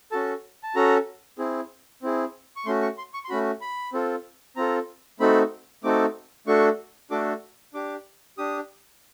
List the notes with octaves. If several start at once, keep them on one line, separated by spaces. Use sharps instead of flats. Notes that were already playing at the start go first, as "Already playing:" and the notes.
C#4 F#4 A4 A5
A5
C#4 F#4 A4 A#5
C4 E4 G#4
C4 E4 G#4
C#6
A3 C#4 F#4 C6
C#6
C6
C#6
C6
A3 C#4 F#4 B5
B5
C4 F4 A4
C4 F4 A4 A#5
A3 C4 D#4 F#4 A4 B5
A3 C4 D#4 F#4 A4 D6
A3 D4 F#4 A4 C#6
A3 D4 F#4 A4 D6
D4 G4 D6
D4 G4 D#6